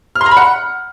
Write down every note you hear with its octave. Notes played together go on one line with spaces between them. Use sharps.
F6
C6
A#5
B5
F#5